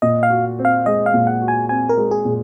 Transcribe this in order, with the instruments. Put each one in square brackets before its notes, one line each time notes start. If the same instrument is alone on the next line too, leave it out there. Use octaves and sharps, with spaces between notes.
[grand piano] A#2 [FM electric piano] D#5
[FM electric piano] F5
[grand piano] F#4
C4
[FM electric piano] F5
[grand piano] G#3 [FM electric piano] D#5
[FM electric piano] F5
[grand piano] A#2
[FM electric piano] F#5
[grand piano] F#4
[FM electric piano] G#5
[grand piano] C4 [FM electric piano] G#5
[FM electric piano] A#4
[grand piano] G#3
[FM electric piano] G#4
[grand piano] A#2